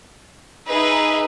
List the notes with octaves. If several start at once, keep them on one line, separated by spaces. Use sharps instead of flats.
D#4 G#4 B4 E5